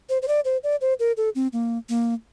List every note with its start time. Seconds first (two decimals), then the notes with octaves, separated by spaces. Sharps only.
0.09 C5
0.22 C5
0.28 D5
0.45 C5
0.63 D5
0.81 C5
0.99 A#4
1.17 A4
1.35 C4
1.53 A#3
1.89 A#3